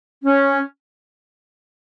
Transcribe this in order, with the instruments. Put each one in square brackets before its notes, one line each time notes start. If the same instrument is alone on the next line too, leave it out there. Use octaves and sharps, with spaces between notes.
[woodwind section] C#4